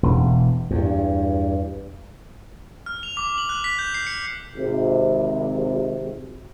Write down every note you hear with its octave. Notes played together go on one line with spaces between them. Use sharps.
E1
E2 G2
F6
F7
D6
F#7
F#6
B6
G6
C7
C#7
G#1 C3